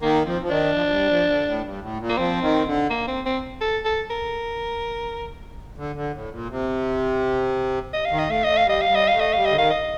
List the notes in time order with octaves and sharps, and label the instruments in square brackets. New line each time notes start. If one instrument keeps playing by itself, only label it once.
[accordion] D#3 [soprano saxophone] A#3
[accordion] F3 [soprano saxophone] C4
[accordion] F3
[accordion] D#3 [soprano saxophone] D4
[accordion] F3
F3
G3
F3
D3
A2
G2
A2
A#2
[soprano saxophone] A#3
[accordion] F3 [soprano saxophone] C4
[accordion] D#3
D3
[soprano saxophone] A#3
C4
C4
A4
A4
A#4
[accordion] D3
D3
A2
A#2
C3
[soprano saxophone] D#5
F5
[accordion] D#3
[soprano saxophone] D#5
[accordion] A3 [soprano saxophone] F5
[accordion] A3 [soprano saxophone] D#5
[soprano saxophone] F5
[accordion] G3 [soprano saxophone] D#5
[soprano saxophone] F5
[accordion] G3
[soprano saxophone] D#5
F5
[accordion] A3
[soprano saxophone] D#5
[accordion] G3 [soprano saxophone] F5
[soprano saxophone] D#5
[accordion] D3
[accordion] D#3 [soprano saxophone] F5
[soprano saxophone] D#5